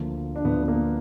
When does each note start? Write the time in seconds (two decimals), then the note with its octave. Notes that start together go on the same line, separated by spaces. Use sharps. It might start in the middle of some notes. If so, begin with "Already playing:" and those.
Already playing: D2 D3 F3 A#3
0.36 D4
0.45 D2 D3 F3 B3
0.63 B3
0.68 A#3